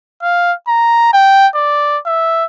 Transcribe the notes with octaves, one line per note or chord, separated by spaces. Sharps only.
F5
A#5
G5
D5
E5